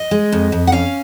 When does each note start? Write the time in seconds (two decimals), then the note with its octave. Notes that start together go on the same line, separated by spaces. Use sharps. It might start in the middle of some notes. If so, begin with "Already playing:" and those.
Already playing: D#5
0.11 G#3
0.32 F2
0.52 F2
0.67 F#5
0.72 C#4 F5